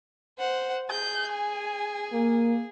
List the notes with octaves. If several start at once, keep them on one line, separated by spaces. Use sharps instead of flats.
C5 F#5
G#4 G6
G#5
A#3